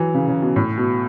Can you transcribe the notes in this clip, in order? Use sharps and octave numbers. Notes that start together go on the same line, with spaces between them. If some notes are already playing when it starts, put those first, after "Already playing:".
Already playing: E3 F#3
C#3
C#3
B2
A2
B2